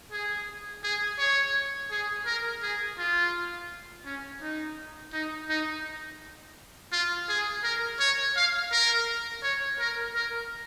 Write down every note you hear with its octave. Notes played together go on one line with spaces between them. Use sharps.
G#4
G#4
C#5
G#4
A#4
G#4
F4
C#4
D#4
D#4
D#4
F4
G#4
A#4
C#5
F5
A#4
C#5
A#4
A#4